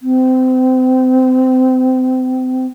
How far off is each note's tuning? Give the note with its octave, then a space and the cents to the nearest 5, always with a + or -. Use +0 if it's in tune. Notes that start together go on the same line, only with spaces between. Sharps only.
C4 -30